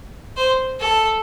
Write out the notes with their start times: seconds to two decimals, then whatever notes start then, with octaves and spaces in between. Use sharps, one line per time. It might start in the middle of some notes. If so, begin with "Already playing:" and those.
0.37 C5
0.81 A4